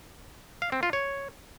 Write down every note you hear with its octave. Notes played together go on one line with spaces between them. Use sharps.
F5
C4
F4
C#5